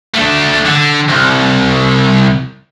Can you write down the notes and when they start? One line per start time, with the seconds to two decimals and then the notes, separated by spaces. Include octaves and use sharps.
0.14 A3 D4
0.66 D3
1.09 C2